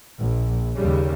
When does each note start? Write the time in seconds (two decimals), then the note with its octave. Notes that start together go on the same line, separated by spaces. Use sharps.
0.21 A#1
0.77 D#2 C#3 G3